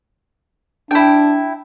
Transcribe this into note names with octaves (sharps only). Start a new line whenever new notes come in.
D4 E4 G5